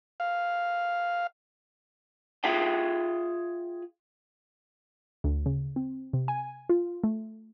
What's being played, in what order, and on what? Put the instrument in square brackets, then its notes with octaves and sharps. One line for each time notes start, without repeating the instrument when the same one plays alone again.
[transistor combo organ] F5
[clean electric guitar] F4 G#4 E5 F5 G5
[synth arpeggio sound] D2
C#3
C4
C3
G#5
F4
A3